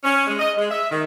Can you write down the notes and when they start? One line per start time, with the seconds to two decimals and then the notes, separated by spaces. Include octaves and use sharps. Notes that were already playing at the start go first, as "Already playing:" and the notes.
0.04 C#4
0.27 G#3
0.39 D#5
0.58 G#3
0.71 E5
0.91 D#3